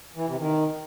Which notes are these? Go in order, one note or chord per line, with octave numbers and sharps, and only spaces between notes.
E3
C3
D#3